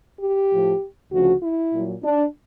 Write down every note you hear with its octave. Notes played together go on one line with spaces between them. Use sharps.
G4
A2 F3
D2 C#3 F3 F#4
E4
A#2 F#3
D4